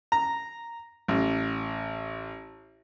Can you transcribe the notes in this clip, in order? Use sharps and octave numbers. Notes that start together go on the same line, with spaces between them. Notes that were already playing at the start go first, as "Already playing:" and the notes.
A#5
A1